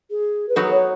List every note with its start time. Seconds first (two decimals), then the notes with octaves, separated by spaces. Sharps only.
0.10 G#4
0.49 B4
0.55 F#3 B3 D#4 F#4 A4
0.70 C#5